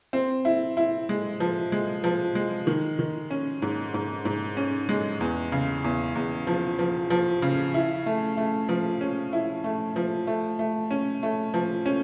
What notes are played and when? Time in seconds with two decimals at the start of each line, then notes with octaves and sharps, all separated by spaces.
0.13 C4
0.45 E4
0.77 E4
1.09 G#3
1.40 F3
1.72 G#3
2.04 F3
2.35 G#3
2.67 D#3
2.99 D#3
3.30 C#4
3.62 G#2
3.94 G#2
4.25 G#2
4.57 C#4
4.89 G#3
5.21 E2
5.52 C#3
5.84 E2
6.15 E2
6.47 F3
6.79 F3
7.10 F3
7.42 C#3
7.74 E4
8.06 A3
8.37 A3
8.69 F3
9.01 C#4
9.33 E4
9.64 A3
9.96 F3
10.27 A3
10.59 A3
10.91 C#4
11.23 A3
11.54 F3
11.86 C#4